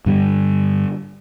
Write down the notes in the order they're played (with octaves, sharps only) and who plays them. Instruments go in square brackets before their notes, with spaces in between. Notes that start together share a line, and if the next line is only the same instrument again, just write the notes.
[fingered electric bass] G2 D3 G3